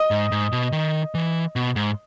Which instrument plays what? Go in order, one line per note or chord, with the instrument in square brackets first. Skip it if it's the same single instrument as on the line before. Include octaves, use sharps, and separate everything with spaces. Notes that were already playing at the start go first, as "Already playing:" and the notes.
Already playing: [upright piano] D#5
[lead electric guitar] G#2
G#2
B2
D#3
E3
B2
G#2